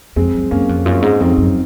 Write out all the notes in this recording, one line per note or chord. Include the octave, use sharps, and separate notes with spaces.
F2 G#3 C4
F#2
F#2 A#3 C#4
F2
F#2 C#4 F4
G#2
F2 C4 D#4
F#2